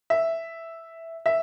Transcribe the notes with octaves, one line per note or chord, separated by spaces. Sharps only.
E5
E5